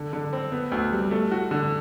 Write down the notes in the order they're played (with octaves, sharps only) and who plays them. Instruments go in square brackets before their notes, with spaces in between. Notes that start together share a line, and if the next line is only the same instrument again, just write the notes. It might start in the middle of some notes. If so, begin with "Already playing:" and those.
Already playing: [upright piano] D3
D3
C4
B3
D2
G3
A3
F#4
D3